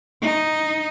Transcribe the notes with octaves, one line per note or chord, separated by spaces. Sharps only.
D#4